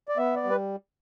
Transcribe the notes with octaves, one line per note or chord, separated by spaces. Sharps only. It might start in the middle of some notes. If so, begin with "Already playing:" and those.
D5
B3 E5
D5
G3
B4